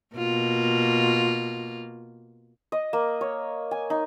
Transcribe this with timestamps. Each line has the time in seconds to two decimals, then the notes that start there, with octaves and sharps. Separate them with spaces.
0.15 B2 A#3 F4
2.72 D#5
2.93 A#3
3.21 C#5
3.71 G#5
3.90 D#4